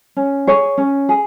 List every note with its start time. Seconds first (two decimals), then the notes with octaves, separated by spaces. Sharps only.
0.17 C#4
0.47 G#4 C#5
0.78 C#4
1.09 G#4